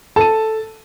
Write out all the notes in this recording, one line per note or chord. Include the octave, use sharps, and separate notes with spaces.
A4 A5 D#7